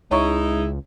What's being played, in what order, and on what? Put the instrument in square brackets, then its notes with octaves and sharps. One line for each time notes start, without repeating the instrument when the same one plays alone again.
[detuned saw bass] C#2 [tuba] G#3 [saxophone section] D#4 E4 [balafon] C#5 A#5 C#6